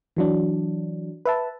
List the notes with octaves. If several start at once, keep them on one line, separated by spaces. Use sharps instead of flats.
E3 F#3 D4
B4 E5 A5